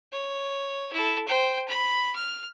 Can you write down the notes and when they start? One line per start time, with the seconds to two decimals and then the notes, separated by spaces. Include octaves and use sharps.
0.12 C#5
0.92 E4 A4
1.28 C5 G5
1.68 B5
2.15 F6